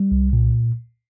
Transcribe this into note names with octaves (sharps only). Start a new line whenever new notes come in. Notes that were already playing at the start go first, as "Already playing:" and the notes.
Already playing: G3
C2
A#2